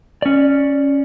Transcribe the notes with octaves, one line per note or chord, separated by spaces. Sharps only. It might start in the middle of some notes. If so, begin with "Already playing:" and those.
C#4 D5